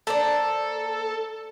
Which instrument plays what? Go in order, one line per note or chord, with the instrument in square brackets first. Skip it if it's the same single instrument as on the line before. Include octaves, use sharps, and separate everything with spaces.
[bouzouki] A#3 C5 D5 [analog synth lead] A4